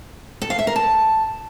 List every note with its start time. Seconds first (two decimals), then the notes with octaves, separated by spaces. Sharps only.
0.42 A4
0.50 F5
0.59 E5
0.67 A#4
0.76 A5